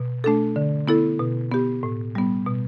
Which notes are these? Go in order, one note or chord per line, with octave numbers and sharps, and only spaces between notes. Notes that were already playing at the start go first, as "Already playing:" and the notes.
Already playing: B2
A3 D4 A4
D3
B3 E4 A4
B2
B3 G4
A2
G3 B3
B2